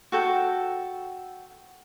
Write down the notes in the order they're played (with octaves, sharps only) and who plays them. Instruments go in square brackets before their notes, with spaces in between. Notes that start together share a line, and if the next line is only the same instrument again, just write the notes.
[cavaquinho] F#4 A4 G5